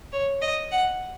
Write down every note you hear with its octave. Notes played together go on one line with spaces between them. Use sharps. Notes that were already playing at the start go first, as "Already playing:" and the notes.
C#5
D#5
F#5